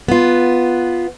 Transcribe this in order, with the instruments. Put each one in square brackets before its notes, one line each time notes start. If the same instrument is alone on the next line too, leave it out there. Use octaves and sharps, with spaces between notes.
[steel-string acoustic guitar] B3 F4